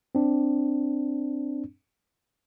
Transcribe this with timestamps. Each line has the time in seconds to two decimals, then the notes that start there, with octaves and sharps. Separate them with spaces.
0.15 C4 D4